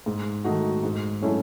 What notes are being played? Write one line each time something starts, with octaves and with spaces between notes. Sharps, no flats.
G#2
D#3 A3 D#4 F#4
G#2
F#3 A3 C#4 E4